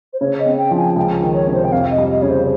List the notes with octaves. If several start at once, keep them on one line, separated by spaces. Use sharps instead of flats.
C5
C#3 C#5
D#5
C4
G5
F3
G#5
C#2 G5
D#3
C#5
C3
C5
G5
F2 F5
D#5
G3
D#5
C#3 C#5
C5